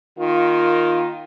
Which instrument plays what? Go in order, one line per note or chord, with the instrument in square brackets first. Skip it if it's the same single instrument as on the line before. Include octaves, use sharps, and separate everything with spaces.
[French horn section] D#3 A#3 F4